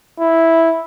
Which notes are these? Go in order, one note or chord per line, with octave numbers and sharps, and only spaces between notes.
E4